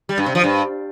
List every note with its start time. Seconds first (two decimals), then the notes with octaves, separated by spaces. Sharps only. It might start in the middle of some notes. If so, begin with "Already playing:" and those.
0.09 G3
0.18 G2
0.26 C3
0.35 F3
0.44 G2